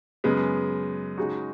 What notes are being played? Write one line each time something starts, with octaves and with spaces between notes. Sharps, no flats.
F#2 C#3 G#3 B3
C#3 G#3 D#4 F#4